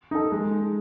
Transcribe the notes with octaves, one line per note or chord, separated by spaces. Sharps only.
D#4 A4
G#3